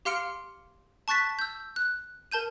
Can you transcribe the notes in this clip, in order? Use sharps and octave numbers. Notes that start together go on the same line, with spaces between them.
G4 F5 C6 F6 C#7 D7
A5 C#6 F#6 A6 B6
E6 G6
F#6
A#4 A5 G6 D#7